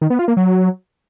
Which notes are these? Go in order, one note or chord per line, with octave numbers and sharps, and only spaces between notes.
D#3
B3
F4
A#3
F#3